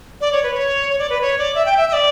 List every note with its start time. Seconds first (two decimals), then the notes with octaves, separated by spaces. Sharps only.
0.21 D5
0.32 C#5
0.43 B4
0.54 C#5
0.90 C#5
0.99 D5
1.10 B4
1.21 C#5
1.38 D5
1.55 E5
1.65 G5
1.77 E5
1.88 E5
1.93 D5